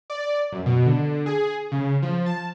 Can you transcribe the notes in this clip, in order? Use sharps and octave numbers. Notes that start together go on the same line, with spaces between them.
D5
F#2
B2
D3
G#4
C#3
F3
A5